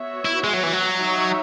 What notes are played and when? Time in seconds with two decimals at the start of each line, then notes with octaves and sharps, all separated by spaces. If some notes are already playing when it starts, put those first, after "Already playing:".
Already playing: B3 F#4 C#5 E5
0.25 E4
0.44 G#3
0.54 F#3
0.63 E3
0.73 F#3
0.99 D#4 F#4 C#5 E5